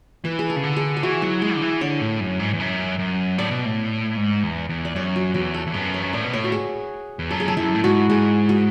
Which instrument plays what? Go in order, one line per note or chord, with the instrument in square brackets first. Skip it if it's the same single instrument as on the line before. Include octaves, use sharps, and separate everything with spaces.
[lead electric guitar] E3 [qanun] B4
[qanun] G#4
A4
[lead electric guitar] C#3
D3
[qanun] G#4
G#4
[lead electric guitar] E3 [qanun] F#4
[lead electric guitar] F#3 [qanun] E4
[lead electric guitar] G#3 [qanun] G#4
[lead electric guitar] D3
E3
[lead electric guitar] D3 [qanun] C#5
[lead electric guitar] A2
F#2
G#2
E2
F#2
F#2
[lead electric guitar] A2 [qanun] D5
[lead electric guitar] B2
A2
G#2
E2
E2
[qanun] D5
[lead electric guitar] F#2 [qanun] C#5
[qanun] F#4
[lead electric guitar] E2 [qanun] F#4
[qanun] A4
[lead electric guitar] E2
[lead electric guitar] F#2 [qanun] B4
[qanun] C#5
[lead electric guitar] A2 [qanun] D5
[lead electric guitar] B2
[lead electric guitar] A2 [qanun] C#5
[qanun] F#4
G#4
[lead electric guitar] E2
[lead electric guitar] F#2 [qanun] A4
[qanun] G#4
A4
[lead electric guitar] F#2 [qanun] E4
[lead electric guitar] A2
[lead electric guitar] G#2 [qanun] F#4
[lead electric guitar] G#2 [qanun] G#4
[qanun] F#4